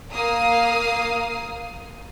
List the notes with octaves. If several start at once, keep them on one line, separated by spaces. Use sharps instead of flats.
A#3 F5 D#6 C7